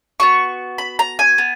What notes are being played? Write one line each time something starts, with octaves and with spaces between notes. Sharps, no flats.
B3 F#4 C#6
B5
A#5
G#5
B3